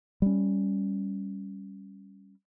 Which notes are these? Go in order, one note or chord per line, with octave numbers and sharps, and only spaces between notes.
G3 C#4